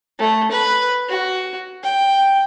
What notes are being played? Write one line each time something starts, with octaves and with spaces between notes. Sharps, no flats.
A3
B4
F#4
G5